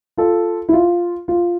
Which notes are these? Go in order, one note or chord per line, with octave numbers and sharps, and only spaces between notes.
F4 A4
E4
F4
F4